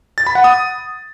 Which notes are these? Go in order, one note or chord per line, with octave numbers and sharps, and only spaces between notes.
A6
B5
F#5
D#6